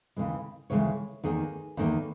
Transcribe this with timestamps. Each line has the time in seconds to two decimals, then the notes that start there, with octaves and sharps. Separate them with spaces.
0.16 D#2 C#3 E3 G#3
0.70 D#2 C#3 E3 G#3 C#5
1.23 E2 D#3 A#3 G#4
1.77 E2 D#3 A#3